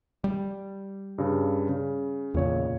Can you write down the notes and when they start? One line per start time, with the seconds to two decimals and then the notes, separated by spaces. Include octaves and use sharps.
0.24 G3
1.18 G2 C#3
1.69 C#3
2.34 E2 A#2 C#3 C#5